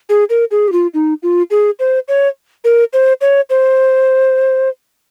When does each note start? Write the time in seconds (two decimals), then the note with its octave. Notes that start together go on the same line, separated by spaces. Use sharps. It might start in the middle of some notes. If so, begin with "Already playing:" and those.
0.09 G#4
0.30 A#4
0.51 G#4
0.68 G4
0.72 F4
0.94 D#4
1.23 F4
1.51 G#4
1.79 C5
2.08 C#5
2.64 A#4
2.93 C5
3.21 C#5
3.50 C5